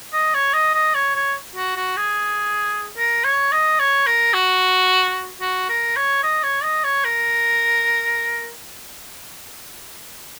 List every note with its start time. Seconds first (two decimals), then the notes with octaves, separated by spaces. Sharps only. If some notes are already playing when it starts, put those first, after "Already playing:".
0.13 D#5
0.34 C#5
0.54 D#5
0.74 D#5
0.94 C#5
1.15 C#5
1.56 F#4
1.76 F#4
1.97 G#4
2.97 A#4
3.24 C#5
3.52 D#5
3.79 C#5
4.07 A#4
4.33 F#4
5.41 F#4
5.69 A#4
5.96 C#5
6.23 D#5
6.43 C#5
6.63 D#5
6.84 C#5
7.05 A#4